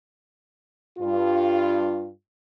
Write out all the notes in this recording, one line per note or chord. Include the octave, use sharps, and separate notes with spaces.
G2 F4